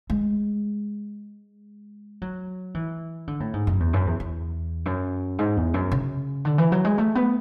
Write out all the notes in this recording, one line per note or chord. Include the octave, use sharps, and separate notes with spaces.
G#3
F#3
E3
D3
A2
G#2
F#2
E2
F#2
E2
E2
F#2
G#2
E2
F#2
C#3
D3
E3
F#3
G#3
A3
B3